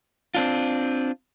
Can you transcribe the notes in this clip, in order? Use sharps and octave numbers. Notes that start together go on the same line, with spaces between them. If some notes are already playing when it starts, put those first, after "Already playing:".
C4 D4 F4